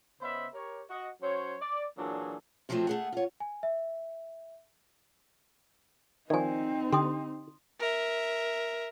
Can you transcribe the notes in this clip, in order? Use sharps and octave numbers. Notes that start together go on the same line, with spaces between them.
C#3 B3 C5 D#5 E5 B5
G4 A#4 C#5
F#4 D#5
F#3 C#4 C5 C#5
D5
A#2 E3 F#3 D4 G#4 A4
C3 F3 F#3 G#3 A3 C4
A3 G#4 F#5
F4 C#5
G#5
E5
D#3 F3 C4 D#4 D5 G#5
D3 G4 C6 D#6
A#4 E5